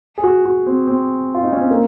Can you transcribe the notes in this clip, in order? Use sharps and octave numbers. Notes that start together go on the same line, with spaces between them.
G#4
F#4
F#4
C4
C4
F4
D#4
C#4
C4
A#3